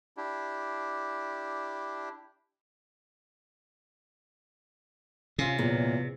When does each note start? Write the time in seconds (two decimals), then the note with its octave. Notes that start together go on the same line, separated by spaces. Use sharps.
0.17 D4 E4 G4
5.38 C3 C#4 F4
5.58 E2 A#2 F#3